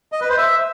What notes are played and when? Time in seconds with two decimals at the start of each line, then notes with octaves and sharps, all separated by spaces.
0.12 D#5
0.21 B4
0.29 C5
0.38 E5